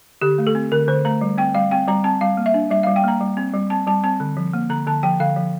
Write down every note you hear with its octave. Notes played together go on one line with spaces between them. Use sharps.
D3 G4
A3
A4
C4
D3 A#4
D3 C5
A3 A#5
G3
C4 G5
G3 F5
C4 G5
G3 A#5
C4 A5
G3 F5
A#3
E5
D4
G3 E5
G3 F5
G5
A#3 A#5
G3
C4
G3
C4 A5
G3 A5
C4 A5
D3
F3
A#3
D3 A#5
D3 A5
F3 G5
D3 F5
F3